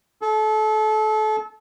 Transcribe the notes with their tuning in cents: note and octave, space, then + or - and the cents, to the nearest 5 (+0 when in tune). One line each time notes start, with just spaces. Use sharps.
A4 -30